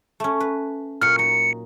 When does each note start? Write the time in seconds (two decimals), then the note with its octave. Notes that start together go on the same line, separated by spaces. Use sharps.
0.20 A3 C#4
0.40 B4
1.01 A#2 F#3 F6 C#7
1.19 D#4 C#7